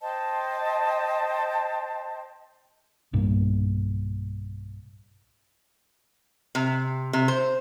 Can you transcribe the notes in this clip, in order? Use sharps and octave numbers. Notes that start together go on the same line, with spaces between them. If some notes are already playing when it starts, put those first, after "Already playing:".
C5 D#5 G5 A5
B1 G2 A#2
C3
C3
C5